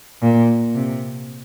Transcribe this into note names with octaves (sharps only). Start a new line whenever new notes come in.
A#2
C3